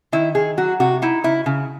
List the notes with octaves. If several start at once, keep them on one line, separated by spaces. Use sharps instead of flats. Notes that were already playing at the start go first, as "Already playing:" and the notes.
D#3 E4
D#3 G#4
F#3 F#4
C3 F#4
D#4 E4
C#3 E4
C#3